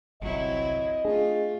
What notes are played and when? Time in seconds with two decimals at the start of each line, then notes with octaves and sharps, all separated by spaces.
0.22 G1 C2 F#3 C4 E4 D#5
1.05 A3 D4 F4 G#4